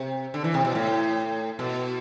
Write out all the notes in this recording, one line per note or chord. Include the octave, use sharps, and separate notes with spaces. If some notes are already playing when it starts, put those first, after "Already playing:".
Already playing: C3
D3
E3
C3
B2
A2
B2